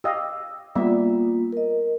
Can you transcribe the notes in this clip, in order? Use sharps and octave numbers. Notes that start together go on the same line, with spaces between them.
G4 D#5 F5 E6
G3 A#3 B3 F4 E5
A#4 D#5